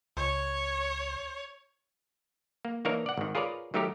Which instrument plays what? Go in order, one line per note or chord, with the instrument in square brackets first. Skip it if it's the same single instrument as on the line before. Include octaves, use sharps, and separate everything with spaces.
[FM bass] C#2 [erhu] C#5
[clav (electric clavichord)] A#3
E3 A#3 D4 D#4 A#4 C#5
D5 F#5
G#1 D#3
F4 G#4 A#4 B4 C#5 D5
D#3 F#3 A3 D#4 G4 A#4